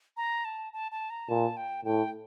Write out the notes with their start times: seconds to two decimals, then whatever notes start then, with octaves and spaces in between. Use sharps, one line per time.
0.17 A#5
0.45 A5
0.73 A5
0.92 A5
1.10 A#5
1.29 A#2 A5
1.57 G5
1.85 A2 G5